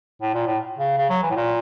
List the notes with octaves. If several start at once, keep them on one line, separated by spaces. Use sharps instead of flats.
A2
A#2
A2
C#3
C#3
F#3
E3
A2
A#2